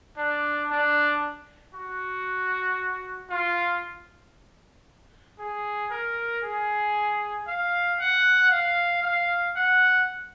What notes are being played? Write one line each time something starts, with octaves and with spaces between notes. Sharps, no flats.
D4
D4
F#4
F4
G#4
A#4
G#4
F5
F#5
F5
F5
F#5